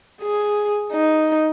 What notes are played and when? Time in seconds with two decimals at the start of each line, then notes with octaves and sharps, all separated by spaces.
0.22 G#4
0.92 D#4